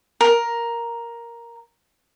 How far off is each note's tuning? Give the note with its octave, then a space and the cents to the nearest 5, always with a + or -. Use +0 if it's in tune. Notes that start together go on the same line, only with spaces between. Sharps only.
A#4 +5